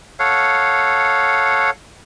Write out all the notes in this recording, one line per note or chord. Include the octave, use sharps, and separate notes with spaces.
A4 C#5 F5 F#5